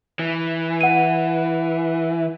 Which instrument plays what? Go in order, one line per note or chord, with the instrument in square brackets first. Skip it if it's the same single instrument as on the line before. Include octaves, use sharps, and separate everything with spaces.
[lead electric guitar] E3
[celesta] F#5 D#7